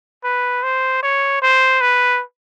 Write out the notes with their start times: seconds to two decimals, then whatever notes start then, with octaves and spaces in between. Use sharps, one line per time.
0.24 B4
0.63 C5
1.03 C#5
1.42 C5
1.81 B4